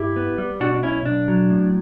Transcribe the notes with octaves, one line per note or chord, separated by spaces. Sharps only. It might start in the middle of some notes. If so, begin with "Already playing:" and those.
Already playing: G2 E4 G4
B3
G3
B2 D4 F#4
D4
B1 C#4 E4
B1 D4
F#3
A2